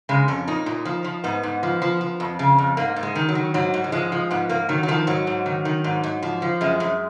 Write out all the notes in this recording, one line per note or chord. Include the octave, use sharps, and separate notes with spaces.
C#3 G#3
F2 C#4
A#2 D#4
A#2
F3
F3
G#2 B3
G#2
F3
F3
F3
F2
C#3
F2
G#2 A#3
G#2
G#3
D#3
F#3
D#3
G#2 F#3
G#2
F#3
F3 G#3
F3
G#2 B3
G#2 A#3
D#3 F#3
F#3
D#3 F3
G#2 F#3
G#2
D#3
D#3
G#2
G#2
F3
F3
F#2 G#3
F#2